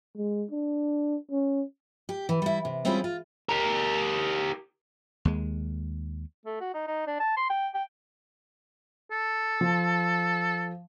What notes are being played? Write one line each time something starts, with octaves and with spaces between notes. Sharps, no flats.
G#3
D4
C#4
G4
E3
G3 E4
C3
G3 C4 C#4 E4 F4 G#4
F4
G4 A#4
D#2 G#3
A3
F#4
D#4
D#4
D4
A5
C6
G5
G5
A4
F3